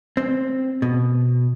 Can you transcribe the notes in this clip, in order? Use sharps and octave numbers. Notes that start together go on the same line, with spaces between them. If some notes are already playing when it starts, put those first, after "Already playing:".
C4
B2